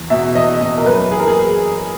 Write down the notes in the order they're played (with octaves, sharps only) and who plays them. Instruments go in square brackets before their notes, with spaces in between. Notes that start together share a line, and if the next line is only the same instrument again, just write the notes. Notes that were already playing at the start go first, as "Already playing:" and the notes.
Already playing: [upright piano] E2
B2 E5
E2 D#5
B2 D#5
A#4
F#2 B4
E3 G#4
A#4
G#4